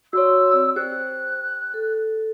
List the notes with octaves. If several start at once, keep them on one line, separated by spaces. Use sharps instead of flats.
F#4 C#5 D5 C6 E6
C4 D5
G4 C5 F#6
A4